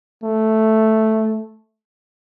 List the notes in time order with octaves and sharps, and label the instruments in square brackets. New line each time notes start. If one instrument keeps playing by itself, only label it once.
[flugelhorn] A3